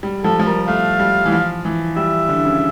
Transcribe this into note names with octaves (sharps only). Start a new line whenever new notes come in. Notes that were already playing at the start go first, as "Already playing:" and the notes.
G3
F3 A4
F3
G3 A#4
A3 F5
G3
E3
F3
E3
G3 E5
D3
C#3